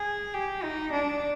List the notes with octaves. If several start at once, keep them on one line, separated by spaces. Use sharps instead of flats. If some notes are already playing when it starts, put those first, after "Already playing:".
Already playing: G#4
G4
D#4
D4